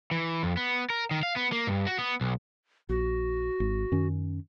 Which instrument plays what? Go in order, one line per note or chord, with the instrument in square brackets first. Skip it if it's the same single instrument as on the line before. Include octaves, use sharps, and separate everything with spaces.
[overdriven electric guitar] E3
F2
B3
A#4
D#3
F5
B3
A#3
G2
F#4
B3
B1
[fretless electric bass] A#1 [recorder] F#4
[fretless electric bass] G#1
F#2 D#3 C#4